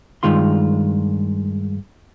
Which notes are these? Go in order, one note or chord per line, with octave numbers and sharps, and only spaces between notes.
G2 D#3 G#3 F4 C6